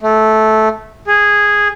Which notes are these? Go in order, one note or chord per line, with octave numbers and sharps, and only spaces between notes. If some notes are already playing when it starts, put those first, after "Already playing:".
A3
G#4